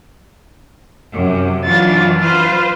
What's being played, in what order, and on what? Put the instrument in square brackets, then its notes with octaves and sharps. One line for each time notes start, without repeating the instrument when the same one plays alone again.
[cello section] F#2 C3
[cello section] E3 F#3 D4 [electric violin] F4 A6
[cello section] F4 B4 C5 [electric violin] F6